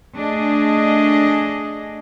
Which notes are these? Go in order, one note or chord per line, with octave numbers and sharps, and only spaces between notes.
A3 D4 G#4 D#5